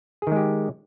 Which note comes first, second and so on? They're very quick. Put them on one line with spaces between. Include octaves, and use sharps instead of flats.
G#4 D#3 G#3 G4